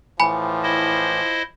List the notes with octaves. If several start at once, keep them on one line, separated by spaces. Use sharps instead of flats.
A2 E3 F3 G#5 B5
E4 C5 D#5